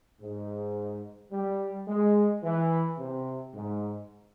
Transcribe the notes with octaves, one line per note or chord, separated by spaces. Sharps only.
G#2
G3
G#3
E3
C3
G#2